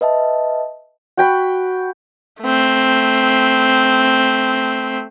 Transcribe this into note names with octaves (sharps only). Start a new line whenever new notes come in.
B4 D#5 E5 A5
F#4 G5 B5
A3 C4